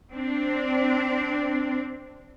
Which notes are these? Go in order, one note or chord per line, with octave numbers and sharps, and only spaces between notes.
C4 D4